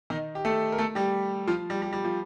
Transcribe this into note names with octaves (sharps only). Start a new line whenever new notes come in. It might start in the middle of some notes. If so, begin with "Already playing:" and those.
D#3 D#4
G4
A3 A4
A#4
A3 A4
G3 G4
F3 F4
G3
G3
G3
F3